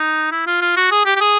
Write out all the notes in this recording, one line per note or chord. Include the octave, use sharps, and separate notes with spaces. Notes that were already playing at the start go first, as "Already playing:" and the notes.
Already playing: D#4
E4
F4
F4
F#4
G#4
G4
G4
G#4